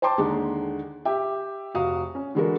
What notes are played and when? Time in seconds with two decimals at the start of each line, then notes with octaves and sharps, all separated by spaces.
0.02 C5 G5 A5 C6 D6
0.18 D#2 D3 G#3 D#4
1.05 G4 E5 G5
1.74 F1 F#4 F5 D#6
2.15 C#4
2.35 D3 E3 G#3 F#4 A4 A#4